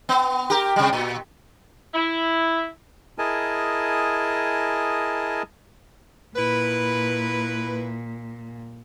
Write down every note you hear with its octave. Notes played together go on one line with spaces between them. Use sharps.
B3
G4 A#4
C3 G3
A#2
E4
E4 G#4 A#4 D#5 G#5 A5
A#2 E4 B4